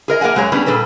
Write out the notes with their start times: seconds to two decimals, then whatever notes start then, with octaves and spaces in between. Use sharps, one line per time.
0.08 G#4 A#4 D#5
0.21 A#3 A#4 F5 F#5 G#5
0.35 F#2 G#3 G4 G#4 C#5 A#5
0.52 G3 B3 C#4 D4 G#4
0.66 A#2 G3 A4 B4